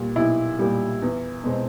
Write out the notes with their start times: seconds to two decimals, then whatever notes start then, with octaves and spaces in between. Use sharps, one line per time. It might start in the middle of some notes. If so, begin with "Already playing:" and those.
Already playing: A#2 G3
0.15 B1 E4
0.59 A#2 G3
1.02 E2
1.44 B2 G#3 C4